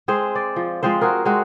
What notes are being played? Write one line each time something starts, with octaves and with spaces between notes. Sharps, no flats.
G#3 C4 G#4 C5
D5
F3
F3 G#3 C4 C5
F#4 G#4 A#4
G#3 C4 F#4